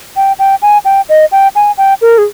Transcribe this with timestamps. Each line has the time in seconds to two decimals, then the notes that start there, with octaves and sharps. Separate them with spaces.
0.16 G5
0.39 G5
0.62 G#5
0.85 G5
1.09 D#5
1.32 G5
1.56 G#5
1.78 G5
2.02 A#4
2.18 G#4